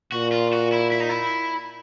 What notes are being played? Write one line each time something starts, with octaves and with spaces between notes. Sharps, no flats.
A#2 F#4
F4
F#4
E4
E4
D#4
E4